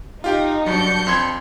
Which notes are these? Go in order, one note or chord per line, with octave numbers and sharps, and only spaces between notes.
D#4 F4 G4 G5
G2 F#3 D4 G6 C#7
F2 C6 G#6